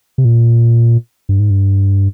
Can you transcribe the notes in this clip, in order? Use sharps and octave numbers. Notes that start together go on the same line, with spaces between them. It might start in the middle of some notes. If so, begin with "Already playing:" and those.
C3
A#2
G2
G#2
G2